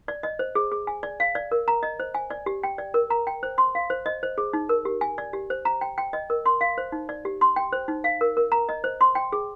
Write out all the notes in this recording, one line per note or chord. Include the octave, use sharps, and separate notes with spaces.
D5
D#5
C5
G#4
G#4
G#5
D5
F5
D5
A#4
A#5
D#5
C5
G#5
D5
G4
G5
D5
A#4
A#5
G5
C5
C6
F5
C5
D#5
C5
G#4
D#4
A#4
G4
G#5
D5
G4
C5
A#5
G5
G5
D#5
A#4
C6
F5
C5
D#4
D5
G4
C6
G5
C5
D#4
F5
A#4
A#4
A#5
D#5
C5
C6
G5
G#4